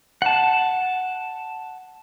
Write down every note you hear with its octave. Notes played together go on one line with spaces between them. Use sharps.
F#5 A5